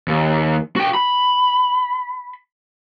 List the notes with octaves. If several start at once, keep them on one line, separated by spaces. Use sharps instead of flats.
D#2
F#4 G5
B5